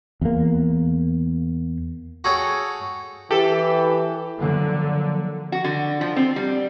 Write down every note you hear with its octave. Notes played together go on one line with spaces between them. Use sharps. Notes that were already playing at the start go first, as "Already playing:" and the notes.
E2 A#3
F#4 G#4 A4 C#5 G5
E3 G4 A4
D3 F3 F#3 A#3
F#4
D3
F3
C4
G3